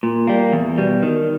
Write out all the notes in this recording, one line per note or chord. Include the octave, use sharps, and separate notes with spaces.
A#2
G3 A#3
E2
B2 G3
D#3